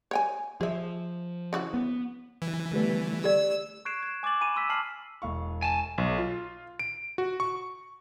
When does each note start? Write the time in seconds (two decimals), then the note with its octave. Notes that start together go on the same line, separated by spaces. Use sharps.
0.11 C#5 G5 G#5
0.61 F3 G#4 E5
1.53 C#3 E3 F#4
1.74 B3
2.42 E3
2.72 D3 G3 A3 B3
3.24 G4 D5 E6
3.85 C#6 F#6 G#6 C7 D7 E7
4.03 G#6
4.23 G#5 D6 G#6 A6 F#7
4.41 G#5 B5 D#7 E7
4.56 C6 E6 B6
4.70 A5 F6 B6 C7 F#7
5.22 E1 F5 C#6
5.62 G#5 A5
5.98 B1
6.18 F4
6.79 D7
7.18 F#4
7.40 C#6